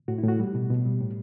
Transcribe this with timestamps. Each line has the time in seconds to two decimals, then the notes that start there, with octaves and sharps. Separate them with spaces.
0.08 A2 F#4
0.18 E4
0.24 A2 F#4
0.39 G3
0.55 B2
0.70 B2
0.85 G3
1.01 A2